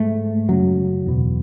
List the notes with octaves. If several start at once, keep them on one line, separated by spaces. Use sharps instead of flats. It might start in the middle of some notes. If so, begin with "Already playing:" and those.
Already playing: G#2 A3
F#2 C#3 F#3
E2 B2